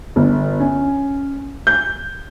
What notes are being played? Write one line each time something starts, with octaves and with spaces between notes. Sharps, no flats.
G1
C#4
G6